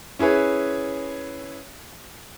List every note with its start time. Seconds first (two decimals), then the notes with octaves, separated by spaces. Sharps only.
0.19 C#4 E4 G#4 B4 C#5